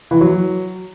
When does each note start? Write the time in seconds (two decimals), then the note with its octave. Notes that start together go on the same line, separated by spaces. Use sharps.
0.11 E3
0.21 F#3